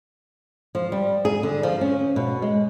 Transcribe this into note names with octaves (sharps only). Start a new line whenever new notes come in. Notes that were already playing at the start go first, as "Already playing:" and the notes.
F3
G3
G#4
D3
F3
C#4
B2
G#3